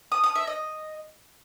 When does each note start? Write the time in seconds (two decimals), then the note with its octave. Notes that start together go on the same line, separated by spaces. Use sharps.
0.12 D#6
0.24 D#6
0.35 E5
0.47 D#5